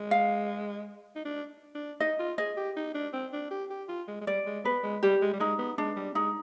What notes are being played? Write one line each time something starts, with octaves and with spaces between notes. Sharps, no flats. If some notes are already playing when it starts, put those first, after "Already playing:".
Already playing: G#3
F5
D#4
D4
D4
D#4 D#5
F4
G#4 D#5
G4
D#4
D4
C4
D4
G4
G4
F4
G#3
G#3
G3 D5
G#3
B3 B4
G#3
G3 G4
G#3
G3
G#3 D#4
B3
G#3 D4
G3
G#3 D#4